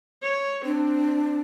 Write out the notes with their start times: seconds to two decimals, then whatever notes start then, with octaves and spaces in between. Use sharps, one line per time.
0.23 C#5
0.65 C4 D4